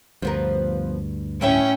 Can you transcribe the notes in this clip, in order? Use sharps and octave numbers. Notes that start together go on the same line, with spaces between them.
D2 G2 F3 B3 A#4
A2 C#4 E4 E5 G5